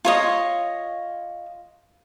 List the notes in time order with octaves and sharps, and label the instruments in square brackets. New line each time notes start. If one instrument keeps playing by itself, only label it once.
[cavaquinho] F4 C#5 D#5